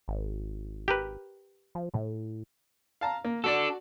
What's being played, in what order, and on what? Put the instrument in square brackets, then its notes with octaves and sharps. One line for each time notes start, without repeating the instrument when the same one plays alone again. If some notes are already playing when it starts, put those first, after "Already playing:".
[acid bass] G#1
[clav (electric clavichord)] G4 A#4 B4
[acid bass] F3
A2
[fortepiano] F5 A5 A#5
A#3
[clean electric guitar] D4 A4 [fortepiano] F#4 D5